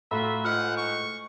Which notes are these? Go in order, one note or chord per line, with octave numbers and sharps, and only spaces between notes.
A2 F4 F#4 E5 A#5 B5
G#2 F4 F#5 F6 F#6
C#6